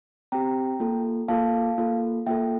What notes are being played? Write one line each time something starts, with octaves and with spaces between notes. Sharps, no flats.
C4 G4 G5 A#5
A#3 F4 A4
A#3 F4 A4 F5 A5
A#3 F4 A4
A#3 F4 A4 E5 G5